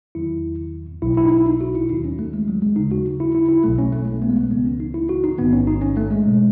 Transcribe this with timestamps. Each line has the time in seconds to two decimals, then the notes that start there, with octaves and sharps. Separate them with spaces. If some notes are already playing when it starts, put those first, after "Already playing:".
0.15 E2 D#3 F#3 E4
1.02 B1 B2 F#3 E4
1.17 E4
1.26 D#4
1.32 E4
1.46 D#4
1.61 F#4
1.75 E4
1.90 D#2 D#3 F#3 D#4
2.04 C#4
2.19 A3
2.34 G#3
2.48 F#3
2.62 G#3
2.76 D#2 C#3 F#3 D#4
2.92 F#4
3.20 E4
3.35 E4
3.49 E4
3.64 B1 B2 F#3 A3
3.79 C#4
3.92 A3
4.08 A3
4.22 B3
4.29 G#3
4.36 A3
4.51 C#2 C#3 E3 B3
4.65 C#4
4.80 D#4
4.94 E4
5.09 F#4
5.24 D#4
5.38 A1 G#2 D#3 B3
5.53 C#4
5.67 D#4
5.82 C#4
5.97 A3
6.10 G#3
6.26 B2 F#3